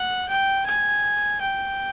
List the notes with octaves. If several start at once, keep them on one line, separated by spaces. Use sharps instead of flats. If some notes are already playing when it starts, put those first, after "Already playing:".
Already playing: F#5
G5
G#5
G5